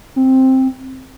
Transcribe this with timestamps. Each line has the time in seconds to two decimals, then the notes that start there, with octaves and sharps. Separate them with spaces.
0.16 C4